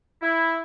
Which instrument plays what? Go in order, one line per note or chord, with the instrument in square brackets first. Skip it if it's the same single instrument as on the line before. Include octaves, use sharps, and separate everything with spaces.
[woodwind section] E4